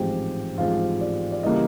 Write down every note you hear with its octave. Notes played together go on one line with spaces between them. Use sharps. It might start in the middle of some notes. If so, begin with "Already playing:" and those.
Already playing: A1 G#2 F3 G#3 C4 G4 G5
A1 G#2 F3 G#3 C4 F4 F5
D5
D5
C#3 E3 G3 A#3 D#5